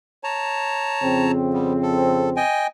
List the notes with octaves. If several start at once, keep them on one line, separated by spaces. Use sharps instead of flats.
C#5 A5 A#5
F2 C#3 C4
G3 B3
A4
D#5 G5 G#5